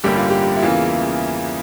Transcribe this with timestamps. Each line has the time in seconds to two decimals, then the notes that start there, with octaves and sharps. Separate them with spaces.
0.04 A1 G2 D3 G3 A#3 G4
0.17 F4
0.30 G4
0.57 E4
0.62 E2 C#3 E3 A#3 F4